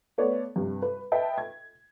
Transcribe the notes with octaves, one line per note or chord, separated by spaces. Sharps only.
A3 B3 C#5 D5
G2 C3
B4
B4 D#5 E5 G5 A5
G#6